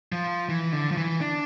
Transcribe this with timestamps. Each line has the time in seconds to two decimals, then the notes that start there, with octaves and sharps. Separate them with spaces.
0.12 F3
0.49 E3
0.73 D3
0.91 F3
0.97 E3
1.21 D4